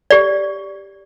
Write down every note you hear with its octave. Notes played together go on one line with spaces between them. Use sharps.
G4 D5